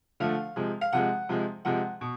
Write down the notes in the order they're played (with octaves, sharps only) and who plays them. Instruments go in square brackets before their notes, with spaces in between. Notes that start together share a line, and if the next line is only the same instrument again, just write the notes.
[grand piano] D3 F3 A3 F5
C3 F3 G#3
F5
C3 F3 G#3 F#5
C3 F3 G#3
C3 F3 G#3 F#5
B2